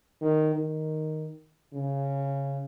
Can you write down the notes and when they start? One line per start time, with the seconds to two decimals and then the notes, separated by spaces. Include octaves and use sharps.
0.21 D#3
0.54 D#3
1.74 C#3